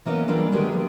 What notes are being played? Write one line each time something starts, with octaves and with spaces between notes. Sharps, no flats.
E3 A#3 B3 C#4 D#5
E3 G3 A#3 D4 F4 A4
D3 D#3 G#3 A3 B3 G4
F3